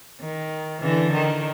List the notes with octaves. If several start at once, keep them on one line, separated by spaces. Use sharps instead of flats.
D#3
D3 E3
D#3